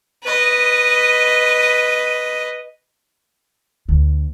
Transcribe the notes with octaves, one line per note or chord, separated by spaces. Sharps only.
B4 D#5
D2